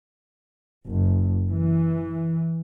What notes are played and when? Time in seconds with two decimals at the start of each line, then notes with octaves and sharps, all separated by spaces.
0.84 F#1
1.49 E3